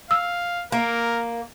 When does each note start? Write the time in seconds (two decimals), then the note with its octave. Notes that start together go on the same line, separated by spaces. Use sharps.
0.11 F5 E6
0.72 A#3 A#4